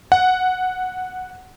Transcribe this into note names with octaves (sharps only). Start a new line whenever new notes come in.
F#5